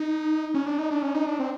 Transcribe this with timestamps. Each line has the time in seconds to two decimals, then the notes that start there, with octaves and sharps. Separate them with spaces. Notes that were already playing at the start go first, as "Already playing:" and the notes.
Already playing: D#4
0.54 C#4
0.66 D4
0.78 D#4
0.91 D4
1.02 C#4
1.15 D#4
1.27 D4
1.39 C4